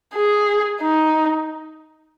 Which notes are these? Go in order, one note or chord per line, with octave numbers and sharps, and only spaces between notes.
G#4
D#4